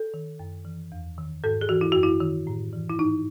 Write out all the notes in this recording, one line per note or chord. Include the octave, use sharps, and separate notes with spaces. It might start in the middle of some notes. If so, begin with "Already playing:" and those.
Already playing: A4
D#3
F#2
E3
E2
D#3
G#2 A4
G#4
E3 F#4
E4
F#2 F#4
E4
D#3
A2
E3
E4
G#2 D#4